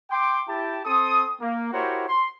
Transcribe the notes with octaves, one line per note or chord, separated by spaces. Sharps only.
G5 C6 D6
E4 G4 G5 A5
C4 A4 C6 D#6
A#3
E4 F#4 G4 A#4 C5 C#5
C6